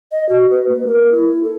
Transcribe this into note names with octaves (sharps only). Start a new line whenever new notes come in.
D#5
F#4
B4
A#3
A#4
E4
A4